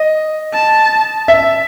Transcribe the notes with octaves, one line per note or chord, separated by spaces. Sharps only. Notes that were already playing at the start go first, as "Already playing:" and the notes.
Already playing: D#5
A5
E5